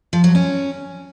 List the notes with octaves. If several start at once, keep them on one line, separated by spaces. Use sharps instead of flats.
F3
F#3
C#4